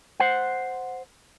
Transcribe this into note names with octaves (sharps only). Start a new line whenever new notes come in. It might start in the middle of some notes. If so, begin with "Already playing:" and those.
C5 F#5